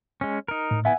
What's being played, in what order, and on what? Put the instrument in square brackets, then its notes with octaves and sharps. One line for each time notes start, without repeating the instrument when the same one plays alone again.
[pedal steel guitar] G#3 C#4
D#4 A#4
[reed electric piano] A2
[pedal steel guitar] B3 E4 [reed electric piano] E5 F#5 G#5